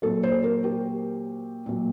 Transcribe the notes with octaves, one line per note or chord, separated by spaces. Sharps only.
A#2 F#3 A4
C5
A#4
G4
A#2 F#3